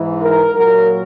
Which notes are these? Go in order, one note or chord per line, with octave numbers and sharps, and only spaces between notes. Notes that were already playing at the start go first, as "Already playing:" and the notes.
Already playing: G#2 E3
A#4
A#2 F#3 A#4